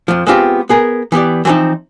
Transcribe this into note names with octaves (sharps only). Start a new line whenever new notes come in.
F2 F3
G#3 B3 C4 F4 G4
B3 G#4 A#4
E3 B3 G4 D5
E3 F3 G3 C4 D#4